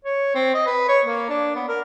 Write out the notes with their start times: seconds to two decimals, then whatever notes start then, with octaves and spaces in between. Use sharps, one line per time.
0.05 C#5
0.35 C4
0.54 D#5
0.66 B4
0.88 C#5
1.05 A#3
1.29 D4
1.56 B3
1.68 A#4